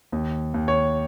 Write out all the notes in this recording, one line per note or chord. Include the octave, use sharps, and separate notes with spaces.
D#2
D#2
C#5